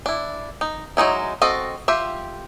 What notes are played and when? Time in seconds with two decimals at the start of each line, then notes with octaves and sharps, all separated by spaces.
0.06 D4 E4
0.61 D#4
0.97 F#3 G#3 D#4 E4
1.42 C4 F#4 A4 D#5
1.88 F4 G4 E5